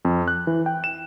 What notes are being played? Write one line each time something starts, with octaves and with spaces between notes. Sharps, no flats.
F2
F#6
E3
G5
E7